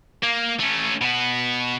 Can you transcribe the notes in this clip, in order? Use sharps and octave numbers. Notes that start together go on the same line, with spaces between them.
A#3
A3 C#4
B2 B3